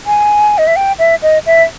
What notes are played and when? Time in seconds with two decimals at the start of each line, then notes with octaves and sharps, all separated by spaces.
0.06 G#5
0.58 D#5
0.67 E5
0.76 G5
0.99 E5
1.22 D#5
1.46 E5